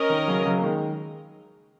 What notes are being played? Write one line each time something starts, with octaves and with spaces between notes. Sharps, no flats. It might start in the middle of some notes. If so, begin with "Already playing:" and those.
Already playing: C#4 A#4 D#5
D#3
C#3 F#3
C#3 F#3
A#3
D#3 G#3